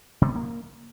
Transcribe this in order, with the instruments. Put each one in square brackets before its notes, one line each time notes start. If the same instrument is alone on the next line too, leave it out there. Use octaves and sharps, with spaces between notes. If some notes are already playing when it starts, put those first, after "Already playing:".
[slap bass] C3
B3
A#3